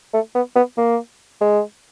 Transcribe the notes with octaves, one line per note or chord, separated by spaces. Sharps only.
A3
B3
B3
A#3
G#3